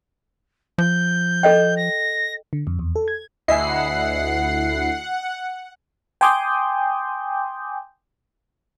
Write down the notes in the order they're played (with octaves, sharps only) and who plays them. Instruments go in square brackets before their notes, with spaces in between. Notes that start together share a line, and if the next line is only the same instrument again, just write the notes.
[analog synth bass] F3 [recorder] G6
[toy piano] A4 D#5 G5
[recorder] A#6
[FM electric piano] D3
F2
E2
A4
G#6
[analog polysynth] D2 E4 C7 [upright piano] D#5 E5 G#5 [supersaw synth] F#5
[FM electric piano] G5 G#5 C6 D6 D#6 G6